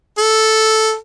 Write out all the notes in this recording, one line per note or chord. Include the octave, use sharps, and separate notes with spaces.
A4